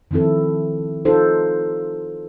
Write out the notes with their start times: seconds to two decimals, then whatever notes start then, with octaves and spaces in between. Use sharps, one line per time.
0.11 D#3 F3 C4 E4 A4
1.05 D#4 F4 A4 C5